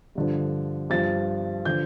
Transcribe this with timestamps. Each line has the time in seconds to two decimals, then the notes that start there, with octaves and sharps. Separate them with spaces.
0.15 G2 D3 F3
0.90 G2 F3 A6
1.65 D3 F3 G6